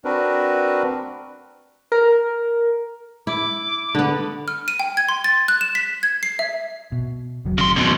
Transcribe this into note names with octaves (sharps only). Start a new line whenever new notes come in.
C4 D4 F#4 A#4 B4
A#4
E4 D6
D3 B3
F6
D#7
G5
G#6
C6
A6
F#6
E7
B6
G#6
C7
E5
B2
F1 F#3
C#3 C6
F#2 B2 E3 B3 C4